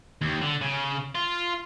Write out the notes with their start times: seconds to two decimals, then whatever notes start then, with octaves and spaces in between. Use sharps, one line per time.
0.21 D#2
0.41 D3
0.61 C#3
1.15 F4